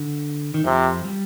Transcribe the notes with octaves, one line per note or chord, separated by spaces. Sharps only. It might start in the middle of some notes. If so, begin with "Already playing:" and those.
Already playing: D3
D#3
F2 C3 F3
G3